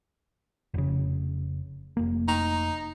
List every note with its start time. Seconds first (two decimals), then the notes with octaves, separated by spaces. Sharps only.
0.74 F1 C#3
1.97 F1 A#3
2.28 D#4